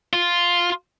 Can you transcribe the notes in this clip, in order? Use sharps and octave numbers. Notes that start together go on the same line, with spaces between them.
F4